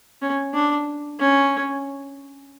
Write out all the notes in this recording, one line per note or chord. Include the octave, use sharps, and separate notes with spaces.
C#4
D4
C#4